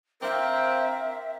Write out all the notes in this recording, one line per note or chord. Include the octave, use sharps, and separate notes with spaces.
C4 A#4 E5 F5 G5 D6